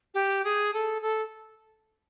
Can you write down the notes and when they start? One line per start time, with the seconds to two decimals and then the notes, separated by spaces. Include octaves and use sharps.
0.14 G4
0.44 G#4
0.74 A4
1.02 A4